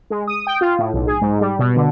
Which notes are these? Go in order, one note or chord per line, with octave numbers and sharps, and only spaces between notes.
G#3
D#6
G5
F4
A2
B1
G#4
G#2
G3
B2
D3